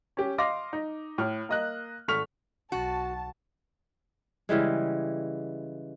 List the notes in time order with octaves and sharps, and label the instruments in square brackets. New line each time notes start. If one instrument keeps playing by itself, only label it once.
[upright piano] C#4 G4
D#5 F5 C6 D6 A#6
D#4
A2 F6
A#3 D#5 F#6
G#1 A3 C#6 F6 B6 F7
[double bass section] B1 [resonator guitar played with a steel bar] F#4 [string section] A5
[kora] C#3 E3 G3 G#3